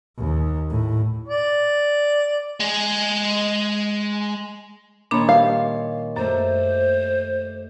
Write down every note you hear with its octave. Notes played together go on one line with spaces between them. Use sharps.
D#2
A2
D5
G#3 G#4
A#2 D#3 D4 C#5 A#5 B5
G3 F5
F#2 A3 D4 C5